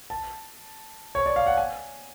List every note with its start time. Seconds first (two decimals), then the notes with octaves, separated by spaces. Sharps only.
0.10 A5
1.15 C#5
1.26 D5
1.36 F5
1.47 F#5
1.58 G#5